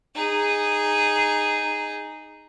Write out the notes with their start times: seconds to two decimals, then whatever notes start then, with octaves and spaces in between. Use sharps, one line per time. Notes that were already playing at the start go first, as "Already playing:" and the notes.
0.15 D#4 G#4